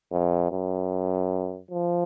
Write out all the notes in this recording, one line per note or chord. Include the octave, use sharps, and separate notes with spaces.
F2
F#2
F3